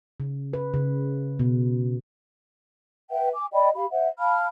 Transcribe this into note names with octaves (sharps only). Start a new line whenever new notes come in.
C#3
B4
C#3
B2
B4 E5 F#5 G5
G#5 D6
D5 D#5 G5 B5
G4 F5 B5
C5 E5 F#5
F5 A5 B5 F6